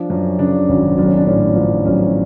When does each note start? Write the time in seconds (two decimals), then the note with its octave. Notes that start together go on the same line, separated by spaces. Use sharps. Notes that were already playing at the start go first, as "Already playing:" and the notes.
Already playing: F3 D4
0.10 F#2 C#4
0.39 C#3 D4
0.69 G#1 C#4
0.98 B1 D4
1.07 C#4
1.17 D4
1.27 A2 C#4
1.56 F3 D4
1.85 B1 C#4